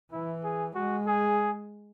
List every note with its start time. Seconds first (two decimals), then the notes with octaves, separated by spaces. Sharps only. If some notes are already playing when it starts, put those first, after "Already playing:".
0.12 E3 E4
0.44 G#4
0.75 G#3 F#4
1.07 G#4